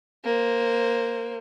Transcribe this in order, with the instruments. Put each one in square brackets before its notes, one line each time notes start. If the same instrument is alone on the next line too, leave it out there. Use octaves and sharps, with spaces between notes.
[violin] A#3 C5